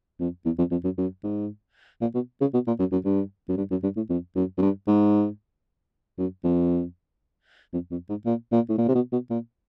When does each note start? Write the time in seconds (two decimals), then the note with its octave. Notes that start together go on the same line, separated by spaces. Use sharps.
0.20 F2
0.45 E2
0.59 F2
0.71 F2
0.84 F#2
0.98 F#2
1.24 G#2
2.01 A#2
2.15 B2
2.41 C#3
2.54 B2
2.67 A#2
2.79 F#2
2.92 F#2
3.05 G2
3.49 F#2
3.57 G2
3.71 F#2
3.83 G2
3.96 A2
4.09 F2
4.36 F#2
4.58 F#2
4.62 G2
4.87 G#2
6.18 F#2
6.44 F2
7.73 F2
7.91 F2
8.09 G#2
8.26 A#2
8.52 A#2
8.69 A2
8.78 A#2
8.88 C3
8.95 B2
9.12 B2
9.30 A#2